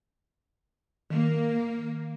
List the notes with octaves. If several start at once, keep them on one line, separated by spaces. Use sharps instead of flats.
D#3 A#3